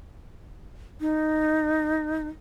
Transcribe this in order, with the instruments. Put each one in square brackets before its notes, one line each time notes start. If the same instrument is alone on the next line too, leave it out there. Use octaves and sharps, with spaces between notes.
[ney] D#4